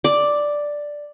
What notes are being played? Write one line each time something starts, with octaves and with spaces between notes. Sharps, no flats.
D5